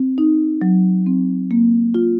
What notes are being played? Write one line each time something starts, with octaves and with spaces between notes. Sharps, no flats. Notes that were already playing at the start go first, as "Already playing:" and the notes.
Already playing: C4
D#4
F#3
C4
A#3
F4